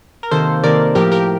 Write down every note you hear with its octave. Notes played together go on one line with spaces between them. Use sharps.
A#4
C3 D#3 A#3 A4 C5
C3 D#3 A#3 A#4 D5
A2 F3 A#3 G4 A#4
G4 A#4